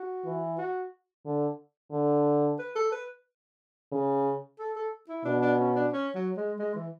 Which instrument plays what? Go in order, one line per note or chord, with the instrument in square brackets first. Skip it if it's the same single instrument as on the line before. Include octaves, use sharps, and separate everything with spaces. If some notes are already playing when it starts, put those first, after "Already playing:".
Already playing: [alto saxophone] F#4
[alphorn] E3
[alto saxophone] F#4
[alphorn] D3
D3
[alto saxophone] B4
A4
B4
[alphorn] C#3
[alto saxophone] A4
A4
E4
[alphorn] B2 [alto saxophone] D4
[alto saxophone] D4
C#4
D4
C#4
F#3
G#3
G#3
E3